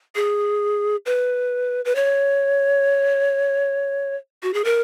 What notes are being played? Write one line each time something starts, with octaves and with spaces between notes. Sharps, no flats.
G#4
B4
B4
C#5
F#4
G#4
A#4